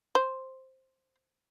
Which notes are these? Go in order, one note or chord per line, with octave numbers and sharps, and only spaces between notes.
C5